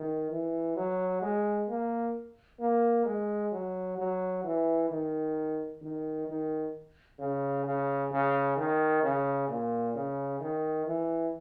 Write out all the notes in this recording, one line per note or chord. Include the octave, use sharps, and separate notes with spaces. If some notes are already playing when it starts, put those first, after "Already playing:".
Already playing: D#3
E3
F#3
G#3
A#3
A#3
G#3
F#3
F#3
E3
D#3
D#3
D#3
C#3
C#3
C#3
D#3
C#3
A#2
C#3
D#3
E3